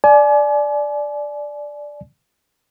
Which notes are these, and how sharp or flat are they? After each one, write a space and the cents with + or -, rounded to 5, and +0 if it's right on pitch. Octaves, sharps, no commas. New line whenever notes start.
D5 +0 G#5 +40